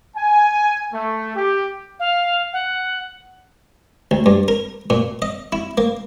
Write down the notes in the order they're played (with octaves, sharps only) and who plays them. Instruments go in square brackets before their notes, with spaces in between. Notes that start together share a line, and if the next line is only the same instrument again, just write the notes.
[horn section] G#5
A3
G4
[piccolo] F5
F#5
[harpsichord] D2
G2
A#4
A#2
D#5
E4
A#3